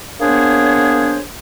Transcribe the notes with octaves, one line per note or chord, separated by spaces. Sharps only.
A#3 B3 D4 G#4 C5 C#5